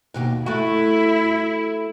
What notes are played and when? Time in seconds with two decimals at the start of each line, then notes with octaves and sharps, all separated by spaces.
0.14 D#2 B2 G4
0.46 A3 E4 F#4